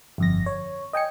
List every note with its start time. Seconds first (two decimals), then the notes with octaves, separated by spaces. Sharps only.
0.18 G1 F2 A#6
0.46 C#5
0.93 D#5 G5 G#5 C#7